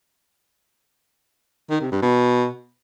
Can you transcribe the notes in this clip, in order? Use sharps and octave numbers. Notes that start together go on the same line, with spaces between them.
D#3
C3
G2
B2